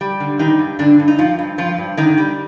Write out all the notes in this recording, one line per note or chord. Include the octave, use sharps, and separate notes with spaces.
G3
D3
D#3 G3 D#4
G2
G2 D3 D4
G2
D#4
G2 F3 F4
G2
G2 F3 F4
G2
D3 D#3 D#4
G3